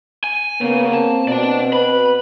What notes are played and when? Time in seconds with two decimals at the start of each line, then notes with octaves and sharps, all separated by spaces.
0.24 G#5
0.61 C#3 A#3 B3
0.93 C4 A5
1.28 B2 D5 A5
1.73 B4 B5